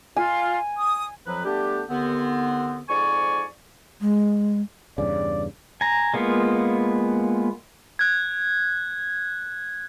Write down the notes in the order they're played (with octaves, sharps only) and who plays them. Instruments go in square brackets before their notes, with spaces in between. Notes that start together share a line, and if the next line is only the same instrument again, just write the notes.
[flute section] F4 [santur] G#5
[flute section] D#6
[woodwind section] F2 F3 F#3 B4
G3 A3 B3 D4 G4
D#2 D3 B3 C4
F2 G#2 D5 G#5 C#6
[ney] G#3
[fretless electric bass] E2 G2 C#3 [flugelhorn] D5
[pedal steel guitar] G#5 A#5
G#3 A#3 B3 F4
[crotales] F#6 G#6